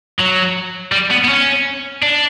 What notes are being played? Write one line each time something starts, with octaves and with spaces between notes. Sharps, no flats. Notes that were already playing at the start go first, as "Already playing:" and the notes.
F#3
G3
B3
B3
C#4
D4